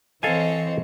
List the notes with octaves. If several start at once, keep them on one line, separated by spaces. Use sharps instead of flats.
E3 C4 A4 C#5 D#5 F5 G#5